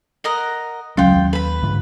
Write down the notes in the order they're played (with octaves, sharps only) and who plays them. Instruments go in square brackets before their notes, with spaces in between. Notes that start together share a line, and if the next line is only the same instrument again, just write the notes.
[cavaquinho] A#4 D#5 F#5
[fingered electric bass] D2 C#3 G#3 [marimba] F#3 C#4 [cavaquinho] F4 G5
[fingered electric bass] D#2
[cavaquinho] B4 B5
[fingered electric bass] G#2 D3 F3